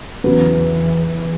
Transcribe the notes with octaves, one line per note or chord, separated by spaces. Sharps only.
E2 C#3 E3 F#3 B3